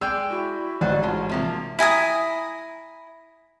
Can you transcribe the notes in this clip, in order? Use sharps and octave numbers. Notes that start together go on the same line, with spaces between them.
G#3 D5 G5 E6
E4 F#4
A1 G#2 D#4 C5 D5 F#5
G#3 F4 A5
C3 F3 A#3 E5
E4 G#5 A#5 D#6